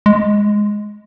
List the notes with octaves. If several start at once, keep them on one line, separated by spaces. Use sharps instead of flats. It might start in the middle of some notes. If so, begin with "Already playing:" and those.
G#3